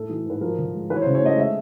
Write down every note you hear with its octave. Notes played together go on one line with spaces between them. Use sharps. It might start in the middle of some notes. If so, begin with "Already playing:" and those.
Already playing: A2 A3 A4
E3
G#2 B4
F3 A#4
D3
G#3
E3 B4
C#5
C5
C#3
C#5
A3 D#5
G#3 E5